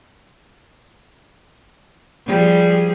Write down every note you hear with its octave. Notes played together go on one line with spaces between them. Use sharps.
F3 G3 G#4